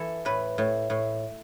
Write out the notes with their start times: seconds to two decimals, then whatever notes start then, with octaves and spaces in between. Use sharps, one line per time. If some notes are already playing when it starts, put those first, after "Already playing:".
Already playing: E3 A4
0.25 A2 B4
0.58 A2
0.90 A2